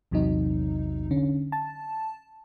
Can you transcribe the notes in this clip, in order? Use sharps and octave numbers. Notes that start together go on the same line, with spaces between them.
A#1 E2 C3 F#3 D#4
D3 C#4
A5